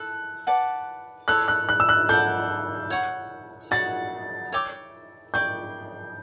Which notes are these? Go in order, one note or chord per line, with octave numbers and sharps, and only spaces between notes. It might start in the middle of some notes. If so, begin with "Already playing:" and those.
Already playing: E4 A4 A5 F#6
B4 D5 F#5 A5
E4 A4 C#5 E5 F#6
F#6
F#6
E6
F#6
A4 D5 F#5 G6
C#5 F#5 C#6
F#4 C#5 F#5 A6
C#5 E5 G5 D6
D5 G5 C#6 G6